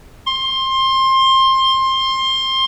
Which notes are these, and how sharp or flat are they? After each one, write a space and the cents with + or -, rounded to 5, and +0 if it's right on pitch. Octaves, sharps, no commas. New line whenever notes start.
C6 +20